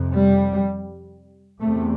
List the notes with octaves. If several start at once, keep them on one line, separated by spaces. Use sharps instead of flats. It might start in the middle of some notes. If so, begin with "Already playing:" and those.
Already playing: F2 C3
G3
E2 C3 A3